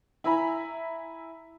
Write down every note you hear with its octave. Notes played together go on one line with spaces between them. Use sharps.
E4 E5 G#5 A#5 B5